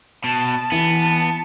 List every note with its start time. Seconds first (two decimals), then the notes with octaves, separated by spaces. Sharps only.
0.24 B2 A5
0.72 E3 B3 A5